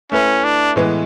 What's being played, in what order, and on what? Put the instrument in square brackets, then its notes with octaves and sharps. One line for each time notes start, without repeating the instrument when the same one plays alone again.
[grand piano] A3 E4 B4 [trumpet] C#4
[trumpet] D4
[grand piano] A2 E3 G#3 B3